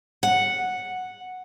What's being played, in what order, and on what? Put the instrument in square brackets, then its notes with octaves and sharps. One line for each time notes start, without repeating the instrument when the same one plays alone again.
[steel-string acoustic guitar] F#5